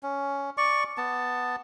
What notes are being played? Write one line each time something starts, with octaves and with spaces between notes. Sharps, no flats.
C#4
D5 C#6
B3 A5